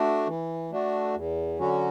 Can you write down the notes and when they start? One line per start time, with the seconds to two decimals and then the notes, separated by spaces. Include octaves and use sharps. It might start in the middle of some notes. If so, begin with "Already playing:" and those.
Already playing: A3 D4 F#4
0.27 E3
0.71 A3 D4 F#4
1.15 E2
1.59 D3 F#3 C#4 F#4